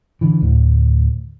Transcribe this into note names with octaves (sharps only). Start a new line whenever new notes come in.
D3 E3
D2 A2